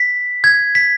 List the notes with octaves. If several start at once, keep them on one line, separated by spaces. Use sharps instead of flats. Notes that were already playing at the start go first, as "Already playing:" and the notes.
Already playing: B6
G#6
B6